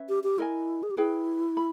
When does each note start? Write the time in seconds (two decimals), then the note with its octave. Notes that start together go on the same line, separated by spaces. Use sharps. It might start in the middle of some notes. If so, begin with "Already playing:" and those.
Already playing: C#4 B4 E5
0.09 G4
0.24 G4
0.38 E4 A#4 D#5 G#5
0.83 G#4
0.91 G4
0.97 E4 G#4 B4 G5
1.57 B5